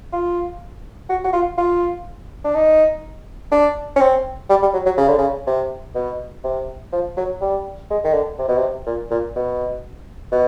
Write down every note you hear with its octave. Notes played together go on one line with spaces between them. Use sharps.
F4
F#4
F#4
F4
F4
D4
D#4
D4
C#4
C4
G3
G3
F#3
F#3
C#3
D3
C#3
C3
B2
C3
F3
F#3
G3
G#3
D#3
D3
C3
B2
C3
A#2
A#2
B2
B2